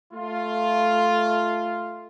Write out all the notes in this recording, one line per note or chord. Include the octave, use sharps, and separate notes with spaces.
A3 F4